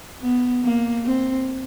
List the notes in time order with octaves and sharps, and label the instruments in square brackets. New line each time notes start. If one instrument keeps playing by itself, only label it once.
[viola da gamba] B3
A#3
C4